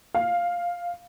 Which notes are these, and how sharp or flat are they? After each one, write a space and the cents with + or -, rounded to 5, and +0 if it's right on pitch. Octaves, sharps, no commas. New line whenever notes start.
F5 +5